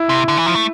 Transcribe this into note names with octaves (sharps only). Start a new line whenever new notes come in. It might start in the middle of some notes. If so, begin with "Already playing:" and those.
Already playing: E4
C3
D3
E3
F3
A3